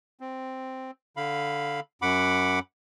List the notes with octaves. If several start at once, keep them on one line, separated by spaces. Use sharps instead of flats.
C4
D3 F5 B5
F#2 F#5 B5 D6